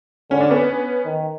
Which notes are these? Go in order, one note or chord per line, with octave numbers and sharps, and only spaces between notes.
D3 C#4
D4
B3 C#4
D#3